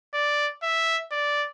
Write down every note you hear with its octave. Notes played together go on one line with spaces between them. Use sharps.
D5
E5
D5